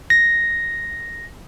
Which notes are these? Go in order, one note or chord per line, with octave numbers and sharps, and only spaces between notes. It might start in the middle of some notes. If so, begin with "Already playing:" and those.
A#6